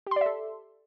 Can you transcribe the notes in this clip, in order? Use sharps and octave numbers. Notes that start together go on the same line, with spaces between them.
G4 A4 D5 E5 C6